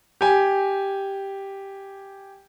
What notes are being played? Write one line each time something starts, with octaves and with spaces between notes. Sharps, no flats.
G4 G#5